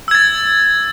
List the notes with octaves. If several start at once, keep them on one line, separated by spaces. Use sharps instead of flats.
E6 G#6 A6